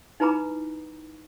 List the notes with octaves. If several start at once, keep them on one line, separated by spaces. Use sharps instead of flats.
D#4 E4 B4 A#5 B5 D6